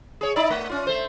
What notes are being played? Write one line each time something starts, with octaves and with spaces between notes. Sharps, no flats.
G#4 C#5
D#4 E4 D5
A3
C#4 F4
A3 C5